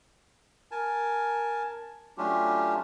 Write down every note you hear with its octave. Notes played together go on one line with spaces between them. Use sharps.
A#4 G#5 A5
F#3 A3 C#4 D4 F4 G4